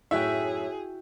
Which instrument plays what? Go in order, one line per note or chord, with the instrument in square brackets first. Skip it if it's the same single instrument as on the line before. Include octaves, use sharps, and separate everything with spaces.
[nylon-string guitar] F#2 A2 F#3 [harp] E4 F#4 G5 [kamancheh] G#4 [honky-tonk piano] E5